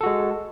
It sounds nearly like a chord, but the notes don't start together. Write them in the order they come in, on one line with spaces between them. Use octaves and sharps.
A4 F#4 G#3